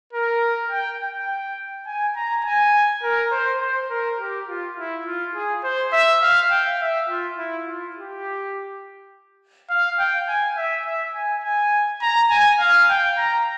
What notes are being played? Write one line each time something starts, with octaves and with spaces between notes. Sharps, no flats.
A#4
G5
G5
G#5
A#5
G#5
A#4
C5
C5
A#4
G4
F4
E4
F4
G#4
C5
E5
F5
G5
E5
F4
E4
F4
G4
F5
G5
G#5
E5
E5
G#5
G#5
A#5
G#5
F5
G5
A#5